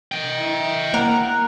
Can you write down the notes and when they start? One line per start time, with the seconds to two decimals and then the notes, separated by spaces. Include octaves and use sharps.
0.12 D#5 G5
0.40 E4
0.94 A#3 A#4 F#5